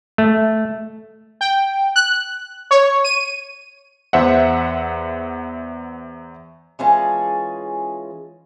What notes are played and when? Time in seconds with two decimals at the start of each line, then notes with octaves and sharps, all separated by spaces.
0.18 A3
1.41 G5
1.96 F#6
2.71 C#5
3.04 D#7
4.13 E2 C5 E5 F#5
6.79 E3 G#3 C#4 F4 G#4 A5